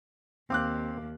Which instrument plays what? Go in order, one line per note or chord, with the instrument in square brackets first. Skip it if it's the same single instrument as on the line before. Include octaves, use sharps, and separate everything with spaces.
[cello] D#2 [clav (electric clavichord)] C4 [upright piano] F5 D6 F#6